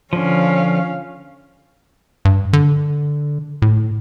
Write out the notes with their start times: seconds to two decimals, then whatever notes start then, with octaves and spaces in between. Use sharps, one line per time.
0.13 D3 F3 C#4 F5
2.25 G2
2.53 D3
3.62 A2